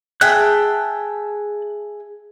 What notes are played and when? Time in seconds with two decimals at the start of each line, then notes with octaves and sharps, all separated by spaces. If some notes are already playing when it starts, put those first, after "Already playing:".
0.21 G#4 E5 G5 A5 F#6